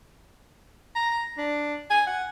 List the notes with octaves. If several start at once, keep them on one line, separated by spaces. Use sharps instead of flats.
A#5
D4
G#5
F#5